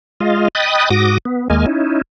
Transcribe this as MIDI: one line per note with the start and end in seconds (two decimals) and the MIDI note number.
0.20 0.48 56
0.20 0.48 65
0.20 0.48 75
0.20 0.48 77
0.55 0.89 75
0.55 0.89 79
0.55 0.89 83
0.55 0.89 87
0.55 0.89 90
0.55 0.89 93
0.91 1.18 44
0.91 1.18 66
0.91 1.18 86
0.91 1.18 87
0.91 1.18 94
1.25 1.48 59
1.50 1.66 39
1.50 1.66 56
1.50 1.66 58
1.50 1.66 75
1.50 1.66 80
1.50 1.66 89
1.66 2.02 61
1.66 2.02 63
1.66 2.02 64